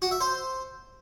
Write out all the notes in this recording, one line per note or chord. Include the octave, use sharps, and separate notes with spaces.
F#4
E5
C5